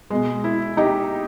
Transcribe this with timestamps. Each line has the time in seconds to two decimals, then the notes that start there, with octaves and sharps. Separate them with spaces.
0.10 B2 G#3
0.44 E4
0.77 D#4 G4